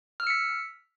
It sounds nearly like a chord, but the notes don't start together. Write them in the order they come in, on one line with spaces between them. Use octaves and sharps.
F6 E6 C#7 B6